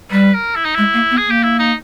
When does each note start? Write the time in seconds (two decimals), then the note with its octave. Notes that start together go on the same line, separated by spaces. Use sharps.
0.11 G3 B4
0.34 A#4
0.56 E4
0.65 D#4
0.75 G#3 E4
0.94 A#3
1.11 B3
1.17 G#4
1.27 A#3 G4
1.43 E4
1.59 D#4